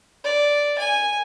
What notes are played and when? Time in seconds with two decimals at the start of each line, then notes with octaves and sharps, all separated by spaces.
0.24 D5
0.78 G#5